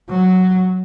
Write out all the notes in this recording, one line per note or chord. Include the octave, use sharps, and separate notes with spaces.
F#3